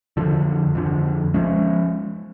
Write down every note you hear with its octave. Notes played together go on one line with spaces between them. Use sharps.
F2 D3 F3
F2 D3 F3
F3 G#3 C#4